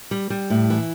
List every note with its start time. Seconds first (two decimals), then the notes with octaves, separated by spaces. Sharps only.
0.11 G3
0.30 G3
0.50 A2
0.70 E3